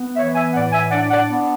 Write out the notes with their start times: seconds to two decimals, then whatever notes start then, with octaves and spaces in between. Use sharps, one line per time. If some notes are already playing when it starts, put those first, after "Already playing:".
Already playing: B3
0.17 E3 C#5 E5
0.35 E5 G#5
0.54 A2 D5 F#5
0.73 E5 G#5
0.91 D4 D5 F#5
1.10 D5 F#5
1.29 B3